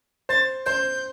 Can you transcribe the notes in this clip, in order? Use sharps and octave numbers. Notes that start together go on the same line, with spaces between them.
C5 A6
C5 G6